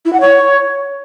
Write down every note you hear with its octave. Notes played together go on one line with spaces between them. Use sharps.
E4
F#5
C#5